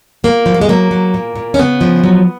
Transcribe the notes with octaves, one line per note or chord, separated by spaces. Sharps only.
A#2 A#3
F3
F#3
G#3
F#3 A#3
F#3
A#2
A#2
C#4
C#3 B3
F3
F#3